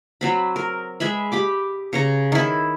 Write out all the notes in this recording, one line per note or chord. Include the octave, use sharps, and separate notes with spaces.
F#3 C4 B5
A#4
G#3 G#4 E5 B5
G4 B5 D6
C#3 C#5 A#5
D#3 E4